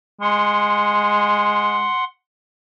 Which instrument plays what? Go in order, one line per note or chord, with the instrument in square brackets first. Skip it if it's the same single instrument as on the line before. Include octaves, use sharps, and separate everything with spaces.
[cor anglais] G#3 [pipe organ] F#5 C6